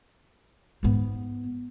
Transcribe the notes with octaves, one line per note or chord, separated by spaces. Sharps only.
G#2 B3